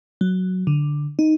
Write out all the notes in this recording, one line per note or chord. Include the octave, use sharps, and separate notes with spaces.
F#3
D3
D#4